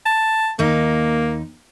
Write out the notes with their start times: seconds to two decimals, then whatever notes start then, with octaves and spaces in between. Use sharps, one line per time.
0.05 A5
0.59 D#2 A#3 D#4